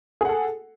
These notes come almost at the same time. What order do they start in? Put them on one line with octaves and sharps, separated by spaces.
G#4 F#5 A4